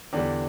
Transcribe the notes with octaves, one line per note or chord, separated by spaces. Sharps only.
E2 D3 G3 D4